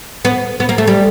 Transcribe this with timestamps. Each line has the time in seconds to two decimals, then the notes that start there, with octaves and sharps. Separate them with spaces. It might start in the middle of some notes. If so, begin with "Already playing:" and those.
0.25 B3
0.60 B3
0.69 A#3
0.78 A3
0.87 G3